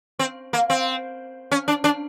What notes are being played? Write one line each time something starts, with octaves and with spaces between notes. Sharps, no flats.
C4
A#3
C4
C#4
D4
D4